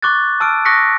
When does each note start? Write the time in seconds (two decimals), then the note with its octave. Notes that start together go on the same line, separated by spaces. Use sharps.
0.02 C#6 D6 F#6 A6
0.40 A5 E6 F6 D7
0.65 C#6 D#6 F#6 A#6 B6 C#7